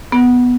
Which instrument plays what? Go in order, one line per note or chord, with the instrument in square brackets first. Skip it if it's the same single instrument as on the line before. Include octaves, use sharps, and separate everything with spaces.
[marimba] B3